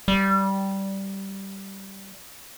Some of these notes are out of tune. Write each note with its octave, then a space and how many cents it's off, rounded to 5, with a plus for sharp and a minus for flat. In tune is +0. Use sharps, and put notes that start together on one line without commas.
G3 -10